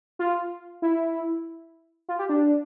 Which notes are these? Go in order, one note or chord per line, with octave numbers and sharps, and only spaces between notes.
F4
E4
F4
G4
D4